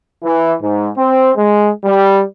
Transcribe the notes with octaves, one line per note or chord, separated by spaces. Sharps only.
E3
G#2
C4
G#3
G3